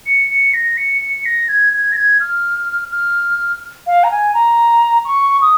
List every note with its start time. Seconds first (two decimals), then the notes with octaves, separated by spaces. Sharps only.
0.06 C#7
0.30 C#7
0.54 A#6
0.77 C#7
1.02 C#7
1.26 A#6
1.49 G#6
1.73 G#6
1.92 A#6
1.96 G#6
2.20 F6
2.92 F6
3.87 F5
4.04 A#5
4.11 G#5
4.34 A#5
5.05 C#6
5.42 D#6